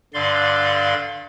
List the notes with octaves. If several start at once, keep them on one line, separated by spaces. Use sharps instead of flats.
G2 D3 D5 F5 C6